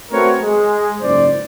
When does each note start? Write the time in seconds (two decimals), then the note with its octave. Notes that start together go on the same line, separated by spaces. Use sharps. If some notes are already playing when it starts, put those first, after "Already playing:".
0.12 A3 C4 F#4 A#4 B4 C#5
0.42 G#3
1.01 F#1 C#2 G#2 C5 D5